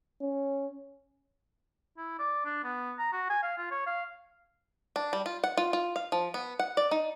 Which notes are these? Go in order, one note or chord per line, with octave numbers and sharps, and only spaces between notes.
C#4
E4
D5
D4
B3
A#5
F#4
G#5
F5
F4
C#5
F5
D4
G3
F4
F#5
F4
F4
F5
F3
B3
F#5
D5
D#4